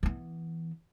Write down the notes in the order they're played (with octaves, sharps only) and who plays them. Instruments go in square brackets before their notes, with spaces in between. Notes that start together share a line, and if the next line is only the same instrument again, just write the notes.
[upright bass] E3 B3